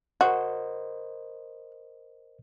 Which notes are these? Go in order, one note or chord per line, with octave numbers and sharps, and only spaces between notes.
F#4 A#4 C5 D#5